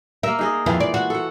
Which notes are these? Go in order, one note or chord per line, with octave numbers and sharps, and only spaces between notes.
A#3 A#4 E5
D#4 G#4 D#5
F2 E3 F4
D5
F#4
A4 F#5